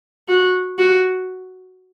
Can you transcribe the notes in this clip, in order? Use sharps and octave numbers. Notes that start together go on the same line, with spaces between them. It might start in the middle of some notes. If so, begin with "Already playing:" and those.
F#4
F#4